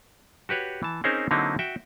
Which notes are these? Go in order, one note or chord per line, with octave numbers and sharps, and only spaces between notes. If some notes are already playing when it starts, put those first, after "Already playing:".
F#4 G4 B4 C#5
E3 A5
C4 C#4 D#4 G#4 A#4 C5
D3 F#3 A#3 C4 D#4 E4
F#4 E5 G5